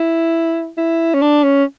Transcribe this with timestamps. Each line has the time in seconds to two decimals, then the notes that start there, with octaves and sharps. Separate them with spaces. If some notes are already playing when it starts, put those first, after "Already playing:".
Already playing: E4
0.77 E4
1.14 C#4
1.22 D4
1.44 C#4